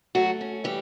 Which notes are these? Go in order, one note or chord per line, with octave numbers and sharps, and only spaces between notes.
F#3 A3 F#4
C#4
E3 G3 G4